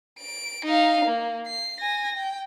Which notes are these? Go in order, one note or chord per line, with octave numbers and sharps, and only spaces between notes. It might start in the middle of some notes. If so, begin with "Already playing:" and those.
D7
D#4 F5
A#3
C7
G#5 A#6
G5